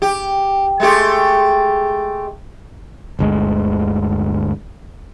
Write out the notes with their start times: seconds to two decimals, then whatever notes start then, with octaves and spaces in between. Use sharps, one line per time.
0.02 G4
0.80 G#3 A3 G4
3.19 G1 D2 G#3